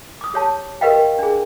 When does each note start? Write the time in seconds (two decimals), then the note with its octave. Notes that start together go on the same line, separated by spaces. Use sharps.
0.21 D6 D#6
0.34 G4 C#5 A5
0.81 G4 A#4 B4 D#5 F5 G5
1.19 D4 G#4